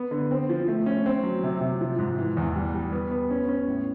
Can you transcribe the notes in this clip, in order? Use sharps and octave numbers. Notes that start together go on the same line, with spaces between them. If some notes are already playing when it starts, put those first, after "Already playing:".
Already playing: B3
D3
C4
F3
A3
C#4
C4
F#3
C3
C3
F3
G#2
E3
E2
G3
G3
B3
B3
C#4
C#4
A2